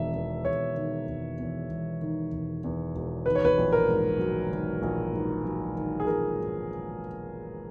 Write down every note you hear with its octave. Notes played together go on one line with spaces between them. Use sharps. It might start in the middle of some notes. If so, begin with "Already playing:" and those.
Already playing: E1 D#3 E5
E2
E1 C#5
D#3
E1
E2
E1
D#3
E1
E2
E1
D#3 B4
C#5
B4
A#1
A#4
G#2
F#3
D#3
A#1
G#2
F#3
D#3
G#4
A#1 A#4
G#2